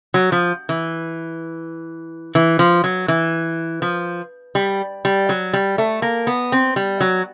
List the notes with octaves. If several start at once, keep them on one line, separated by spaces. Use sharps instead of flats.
F#3
F3
E3
E3
F3
F#3
E3
F3
G3
G3
F#3
G3
A3
A#3
B3
C4
G3
F#3